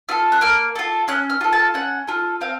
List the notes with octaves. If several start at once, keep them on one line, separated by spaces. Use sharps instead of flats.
F4 A4 F6
F#6
A#3 F6
F4 A4
C#4 F#6
F6
F4 A4
A5
C#4 F#5
F4 A4
C4 F5